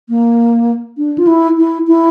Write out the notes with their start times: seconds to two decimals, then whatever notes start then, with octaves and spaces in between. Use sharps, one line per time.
0.09 A#3
0.98 D4
1.18 F4
1.27 E4
1.58 E4
1.87 E4